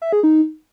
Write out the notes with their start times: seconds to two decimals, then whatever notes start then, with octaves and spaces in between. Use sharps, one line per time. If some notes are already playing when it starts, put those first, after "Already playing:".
0.02 E5
0.13 G#4
0.23 D#4